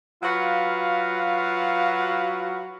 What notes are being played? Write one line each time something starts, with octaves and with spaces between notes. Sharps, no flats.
F#3 F4 F#4 B4 F5